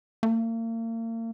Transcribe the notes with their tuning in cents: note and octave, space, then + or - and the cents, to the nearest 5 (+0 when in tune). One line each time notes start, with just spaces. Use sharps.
A#3 -40